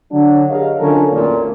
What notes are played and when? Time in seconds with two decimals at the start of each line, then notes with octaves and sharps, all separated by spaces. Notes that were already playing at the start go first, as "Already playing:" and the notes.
0.12 D3 F#3 D4
0.50 G4 G#4 A#4 C#5 D#5 F5
0.80 D3 F#3 C#4 F4 A4 A#4
1.12 A1 E2 A#2